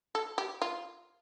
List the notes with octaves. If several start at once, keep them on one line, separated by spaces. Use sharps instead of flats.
A4
G4
F4